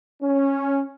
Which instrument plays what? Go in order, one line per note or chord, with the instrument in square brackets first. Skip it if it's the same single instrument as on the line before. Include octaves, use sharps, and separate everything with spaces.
[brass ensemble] C#4